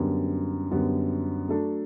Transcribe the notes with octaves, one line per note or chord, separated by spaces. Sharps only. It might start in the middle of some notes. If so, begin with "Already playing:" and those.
Already playing: F#2 D3 G3 B3
F#2 D3 G3 B3
F#3 A3 D4 A4